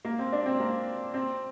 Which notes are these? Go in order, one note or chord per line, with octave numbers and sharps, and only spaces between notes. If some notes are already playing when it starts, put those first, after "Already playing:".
A#3
C4
D4
C4
A#3
C4